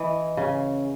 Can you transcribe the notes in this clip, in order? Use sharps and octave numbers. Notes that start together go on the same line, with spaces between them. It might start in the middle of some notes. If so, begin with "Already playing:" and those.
Already playing: E3 D#5
C#3 G#5